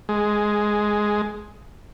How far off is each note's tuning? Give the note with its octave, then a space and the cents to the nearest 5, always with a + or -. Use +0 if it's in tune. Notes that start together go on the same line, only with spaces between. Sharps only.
G#3 +5